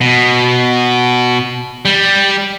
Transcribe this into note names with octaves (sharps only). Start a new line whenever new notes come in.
B2
G3